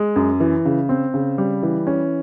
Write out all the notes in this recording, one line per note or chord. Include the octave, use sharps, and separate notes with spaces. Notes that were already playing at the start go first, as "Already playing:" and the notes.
Already playing: G#3
F#2
E3
C#3
C4
C#3
G3
E3
C#4